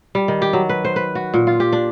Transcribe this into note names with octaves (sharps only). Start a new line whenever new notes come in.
G3
D#3
G4
F#3
B4
C5
B4
F#4
A#2
F4
G4
D4